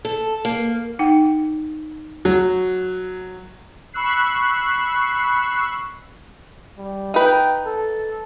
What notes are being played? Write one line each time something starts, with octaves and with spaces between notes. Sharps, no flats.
A4
A#3
D#4 F#5 G5
F#3
B5 C#6 E6 F#6 C7
G3
D#4 B4 G5
A4